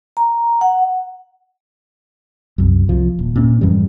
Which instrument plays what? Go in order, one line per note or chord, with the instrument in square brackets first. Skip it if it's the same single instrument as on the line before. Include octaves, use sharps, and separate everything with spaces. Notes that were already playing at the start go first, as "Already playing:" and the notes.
[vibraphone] A#5
F#5
[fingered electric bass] C2 F#2
C2 F3
D#1
A#2 C#4
F2 G#2 E3 G3